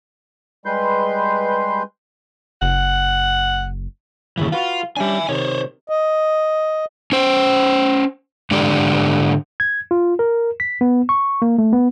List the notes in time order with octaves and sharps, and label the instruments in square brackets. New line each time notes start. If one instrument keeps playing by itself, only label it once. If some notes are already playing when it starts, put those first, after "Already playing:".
[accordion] G3 G#3 B4 C6 G6
[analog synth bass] F#1 [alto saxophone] F#5
[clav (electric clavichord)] G1 C#3 [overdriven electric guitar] D#2 E3
[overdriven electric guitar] F4 [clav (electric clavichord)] F#4 B4 F5
[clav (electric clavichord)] G3 C#4 D4 [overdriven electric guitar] E5 G#5
[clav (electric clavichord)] C3 D#3 [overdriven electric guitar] C5 C#5
[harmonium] D#5
[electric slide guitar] C#4 C5
G#2 D3 G#3 G4 D5
[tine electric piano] G#6
F4
A#4
B6
B3
C#6
A#3
A3
B3